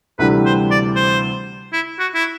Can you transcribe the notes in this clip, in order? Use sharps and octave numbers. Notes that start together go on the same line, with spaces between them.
D2 C3 E3 G3 B4
C5
D5
C5
E4
F#4
E4